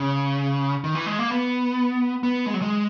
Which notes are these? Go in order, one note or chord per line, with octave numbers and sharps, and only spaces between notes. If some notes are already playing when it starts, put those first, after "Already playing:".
Already playing: C#3
D#3
E3
G#3
A#3
B3
B3
G#3
F#3
G#3